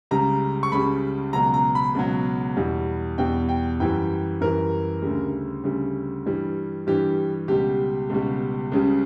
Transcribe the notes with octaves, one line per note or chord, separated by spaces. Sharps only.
C#2 C#3 G3 A#5
C#6
C#2 C#3 G3 B5
C#2 B2 F#3 A#5
A#5
B5
C#2 B2 F#3
E2 B2 G3
E2 B2 G3 G5
G5
F#2 E3 G3 G5
F#2 E3 G3 A#4
D2 C#3 G3
D2 C#3 G3
G2 E3 G3
G2 E3 G3 G4
C#2 B2 G3 G4
C#2 B2 G3
C#2 C#3 G3